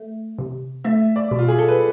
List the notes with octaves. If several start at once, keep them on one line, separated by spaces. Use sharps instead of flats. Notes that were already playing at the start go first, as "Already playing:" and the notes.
Already playing: A3
C3
A3 E5
D5
B2
F4
G#4
A4
B4